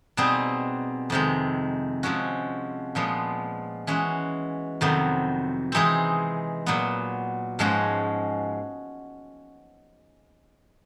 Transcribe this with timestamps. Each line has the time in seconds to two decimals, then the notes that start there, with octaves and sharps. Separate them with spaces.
0.17 B2 G3 C4 D#4 G#4
1.10 F2 C3 D#3 G#3
2.03 C3 F3 G#3 C#4 F#4
2.95 A#2 F3 G#3 B3
3.87 E3 G#3 C#4 F#4
4.81 F2 C3 D#3 F#3 B3
5.72 E3 G#3 C4 D#4 G#4
6.66 A#2 F#3 B3
7.59 G#2 F3 G#3 C#4 F#4